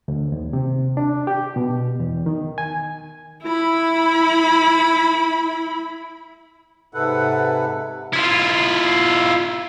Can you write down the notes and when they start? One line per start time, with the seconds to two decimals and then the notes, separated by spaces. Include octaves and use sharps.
0.08 D2
0.32 D#2
0.53 C3
0.97 D4
1.27 G4
1.56 B2
2.00 E2
2.26 D#3
2.58 G#5
3.44 E4 B5
6.94 G#2 C3 A4 B4 F#5
8.13 E4 F4